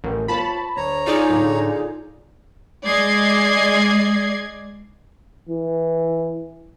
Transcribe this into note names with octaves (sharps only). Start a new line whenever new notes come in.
A1 D#3
F4 C5 C#5 A5 B5
D2 C#5 A#5
D#4 F4 G#4 D5
A2 D3
G#3 D5 D#5 G#6 C7
E3